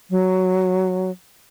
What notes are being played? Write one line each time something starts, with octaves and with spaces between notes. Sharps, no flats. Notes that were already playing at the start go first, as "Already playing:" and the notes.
F#3